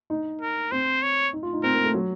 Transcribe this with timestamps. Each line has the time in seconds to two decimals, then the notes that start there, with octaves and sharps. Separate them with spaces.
0.10 D#4
0.41 A#4
0.72 C4 C5
1.02 C#5
1.33 D#4
1.43 F4
1.53 D#4
1.63 C4 A#4
1.74 A#3
1.84 A3
1.94 F#3